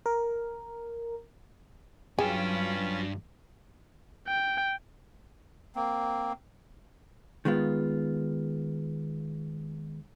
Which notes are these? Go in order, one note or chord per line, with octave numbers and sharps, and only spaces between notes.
A#4
G2 F#3 C#4 F4 G#4 B4 G5
G5
A#3 C4
D#3 G#3 B3 F4